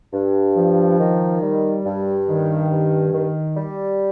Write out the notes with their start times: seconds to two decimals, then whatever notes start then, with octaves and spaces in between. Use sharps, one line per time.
0.13 G2
0.55 F3
0.99 D#3
1.41 G3
1.84 G2
2.27 D#3
2.70 G2
3.12 D#3
3.56 G3